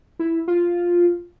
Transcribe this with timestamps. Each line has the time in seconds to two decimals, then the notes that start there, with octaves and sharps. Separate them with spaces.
0.19 E4
0.48 F4